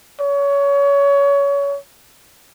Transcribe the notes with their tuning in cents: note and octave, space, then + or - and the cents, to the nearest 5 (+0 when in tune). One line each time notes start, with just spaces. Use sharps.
C#5 +25